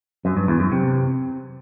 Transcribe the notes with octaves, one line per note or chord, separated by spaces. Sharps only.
F#2
G2
E2
F#2
C3